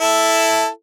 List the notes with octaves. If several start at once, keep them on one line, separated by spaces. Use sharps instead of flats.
E4 A4